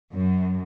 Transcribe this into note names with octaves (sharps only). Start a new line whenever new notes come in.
F#2